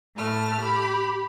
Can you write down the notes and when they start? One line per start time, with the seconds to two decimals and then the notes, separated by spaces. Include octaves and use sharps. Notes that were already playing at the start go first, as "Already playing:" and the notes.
0.16 A2 A3 A5 F6
0.61 G4 B5